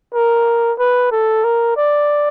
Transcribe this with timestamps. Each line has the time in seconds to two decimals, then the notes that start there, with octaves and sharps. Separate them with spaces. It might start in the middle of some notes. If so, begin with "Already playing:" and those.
0.15 A#4
0.79 B4
1.12 A4
1.44 A#4
1.77 D5